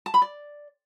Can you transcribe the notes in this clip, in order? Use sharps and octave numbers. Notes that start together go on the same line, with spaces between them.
A5
B5
D5